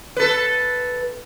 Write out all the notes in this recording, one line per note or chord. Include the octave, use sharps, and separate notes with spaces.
A4 B4